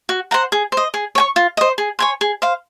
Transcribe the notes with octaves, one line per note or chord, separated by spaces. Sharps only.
F#4
C5 F#5 A#5
G#4
C5 D#5
G#4
C#5 G#5 C#6
F4
C5 D#5
G#4
C#5 G#5 C6
G#4
C5 F5